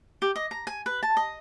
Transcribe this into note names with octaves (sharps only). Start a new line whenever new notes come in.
G4
D#5
A#5
G#5
B4
A5
D#5